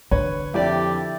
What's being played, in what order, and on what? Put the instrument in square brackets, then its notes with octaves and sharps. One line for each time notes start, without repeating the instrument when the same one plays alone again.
[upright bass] D3 [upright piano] B4 [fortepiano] C#5
[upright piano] F2 [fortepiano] E4 D5 [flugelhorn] G4